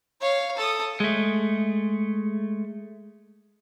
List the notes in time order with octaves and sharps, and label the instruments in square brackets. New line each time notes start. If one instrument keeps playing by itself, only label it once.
[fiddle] C#5 F5
A4 D#6
[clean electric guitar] G#3 A3